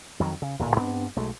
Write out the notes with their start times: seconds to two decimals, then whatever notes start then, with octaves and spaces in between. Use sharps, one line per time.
0.20 F2 D#3 F#3
0.42 C#3
0.59 D1 A#2
0.76 G2 B3 C4 D4
1.16 B1 G#3 A3